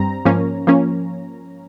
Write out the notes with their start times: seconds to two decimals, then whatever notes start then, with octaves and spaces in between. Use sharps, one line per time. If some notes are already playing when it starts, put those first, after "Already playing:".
Already playing: G2 G3 C4 A#5
0.25 G#2 F3 A#3 C#4
0.67 F3 A#3 C#4